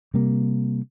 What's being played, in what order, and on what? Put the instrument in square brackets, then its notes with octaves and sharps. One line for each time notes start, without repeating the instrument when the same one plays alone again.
[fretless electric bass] C3 G3 A#3